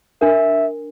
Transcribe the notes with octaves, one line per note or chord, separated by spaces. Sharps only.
D4 A#4 E5